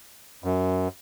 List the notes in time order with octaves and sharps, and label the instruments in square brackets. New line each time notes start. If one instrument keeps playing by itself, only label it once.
[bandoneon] F#2